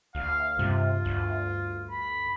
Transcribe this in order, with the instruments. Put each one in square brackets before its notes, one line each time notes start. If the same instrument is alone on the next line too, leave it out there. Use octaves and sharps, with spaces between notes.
[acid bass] D2 [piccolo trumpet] F5
[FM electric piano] G2 [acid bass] C3 [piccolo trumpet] F4
[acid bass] D2
[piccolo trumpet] B5